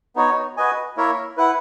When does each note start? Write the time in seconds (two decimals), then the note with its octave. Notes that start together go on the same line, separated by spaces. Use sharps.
0.16 B3 D#4 F#4 C#5
0.57 F#4 B4 D#5 G#5
0.97 A#3 E4 A#4 C#5 E5
1.37 E4 B4 F#5